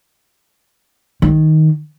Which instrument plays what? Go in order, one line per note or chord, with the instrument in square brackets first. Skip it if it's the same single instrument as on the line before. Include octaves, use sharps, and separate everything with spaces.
[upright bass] D#3